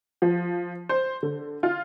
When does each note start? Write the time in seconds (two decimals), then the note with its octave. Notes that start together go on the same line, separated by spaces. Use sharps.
0.22 F3
0.89 C5
1.23 D3
1.63 F4